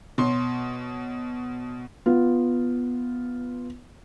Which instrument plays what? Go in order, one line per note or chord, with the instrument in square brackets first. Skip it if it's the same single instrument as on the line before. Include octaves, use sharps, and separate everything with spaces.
[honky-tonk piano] B2 C#5 C6
[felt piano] B3 F4